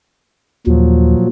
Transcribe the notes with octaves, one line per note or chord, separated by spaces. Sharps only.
D#2 A#2 F3 F#3